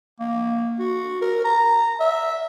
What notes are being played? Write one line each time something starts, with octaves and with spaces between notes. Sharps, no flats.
A#3
F#4
A#4
A#5
E5